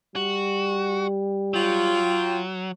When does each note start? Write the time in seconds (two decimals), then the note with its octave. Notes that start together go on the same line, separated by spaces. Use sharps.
0.16 G3 F#4
1.54 F#3 F4 G5